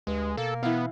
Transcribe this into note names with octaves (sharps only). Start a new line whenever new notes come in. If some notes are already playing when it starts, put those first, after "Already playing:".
D2 G2 G#3
B2 A#3 A4
E3 B3 F5